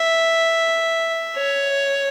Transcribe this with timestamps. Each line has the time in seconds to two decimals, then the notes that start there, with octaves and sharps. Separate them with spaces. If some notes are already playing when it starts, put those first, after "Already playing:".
Already playing: E5
1.37 C#5